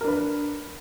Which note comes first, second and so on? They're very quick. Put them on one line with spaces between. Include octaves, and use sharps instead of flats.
A#4 D4 B4